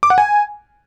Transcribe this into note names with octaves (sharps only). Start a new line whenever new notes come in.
D6
F#5
G#5